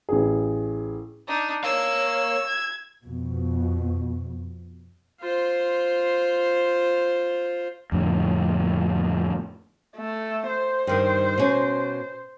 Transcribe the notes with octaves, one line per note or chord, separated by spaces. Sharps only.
A1 G#4
D4 D#4
A#4 C#5 F5 E6
G#6
F2 B2
F4 C5
F2 A2 D3
A3
C5
G2 D#3
B2 C#4